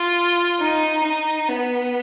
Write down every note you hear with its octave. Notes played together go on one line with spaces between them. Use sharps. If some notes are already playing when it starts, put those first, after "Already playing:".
Already playing: F4
D#4
D#4
B3